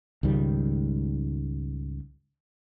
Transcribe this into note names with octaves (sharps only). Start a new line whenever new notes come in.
C#2 G#2 D#3 G3